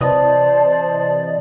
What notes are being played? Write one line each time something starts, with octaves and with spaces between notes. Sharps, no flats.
C3 E3 C5 D5 D#5 A5